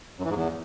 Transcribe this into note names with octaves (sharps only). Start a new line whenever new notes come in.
F#2
E3
G#2
E2